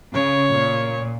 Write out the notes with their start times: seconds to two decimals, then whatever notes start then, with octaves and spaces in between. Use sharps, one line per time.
0.13 C#3 C#5
0.53 A#2